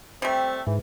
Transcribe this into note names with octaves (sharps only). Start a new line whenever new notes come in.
G3 A3 C4
G#2 E3